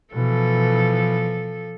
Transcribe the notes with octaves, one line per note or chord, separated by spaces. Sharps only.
B2 E3 F3 A4